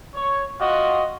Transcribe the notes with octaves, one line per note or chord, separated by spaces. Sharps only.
C#5
F4 F#4 D#5